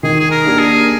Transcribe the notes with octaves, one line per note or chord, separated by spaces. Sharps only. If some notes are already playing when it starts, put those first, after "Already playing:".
D#3 G#4
G#4
A#4
A#3 D4 G4
G#4